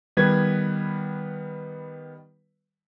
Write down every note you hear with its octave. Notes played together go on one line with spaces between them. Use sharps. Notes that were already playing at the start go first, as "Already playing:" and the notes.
D#3 G3 B3 B4 G#6